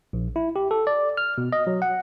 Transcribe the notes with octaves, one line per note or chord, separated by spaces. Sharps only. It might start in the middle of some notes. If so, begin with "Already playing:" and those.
A#1
E4
G4
A4
D5
F6
B2
D#5
F#3
F#5